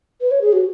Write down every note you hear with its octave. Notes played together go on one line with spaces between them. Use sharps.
B4
C#5
G#4
F#4